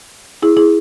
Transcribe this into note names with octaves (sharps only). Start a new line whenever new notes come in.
E4 G#4
E4 G#4